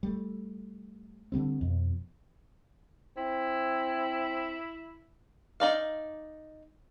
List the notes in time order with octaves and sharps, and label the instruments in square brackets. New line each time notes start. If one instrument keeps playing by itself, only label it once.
[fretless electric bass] G3 A3
D3 F#3 G3 C4
F2 B2
[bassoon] C4 [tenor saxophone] E4
[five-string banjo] D#4 D5 F5